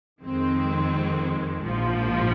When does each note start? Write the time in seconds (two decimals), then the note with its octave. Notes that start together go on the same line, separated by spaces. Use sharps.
0.22 F2 D#3 G#3 C4
1.62 A#1 G#2 F3